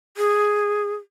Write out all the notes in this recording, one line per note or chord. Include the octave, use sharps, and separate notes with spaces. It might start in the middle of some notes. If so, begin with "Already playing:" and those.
G#4